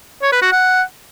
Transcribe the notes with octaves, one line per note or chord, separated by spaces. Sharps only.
C#5
B4
F#4
F#5